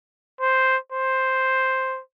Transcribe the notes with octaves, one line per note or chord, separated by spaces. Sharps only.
C5
C5